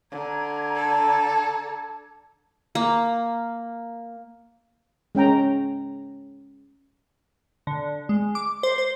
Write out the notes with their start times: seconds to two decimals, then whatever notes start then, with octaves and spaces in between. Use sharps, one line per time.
0.11 D3 A#5 G#6
0.75 A4
2.75 A#3
5.15 G#3 C#4 G5 A#5
7.67 D3
8.09 G#3
8.35 D6
8.63 C5
8.78 C5